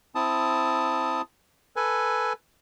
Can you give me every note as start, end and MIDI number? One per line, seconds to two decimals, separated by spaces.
0.15 1.22 60
0.15 1.22 64
0.15 1.22 81
0.15 1.22 87
1.76 2.33 69
1.76 2.33 71
1.76 2.33 80